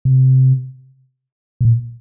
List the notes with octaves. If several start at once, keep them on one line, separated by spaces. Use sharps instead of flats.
C3
B2
A#2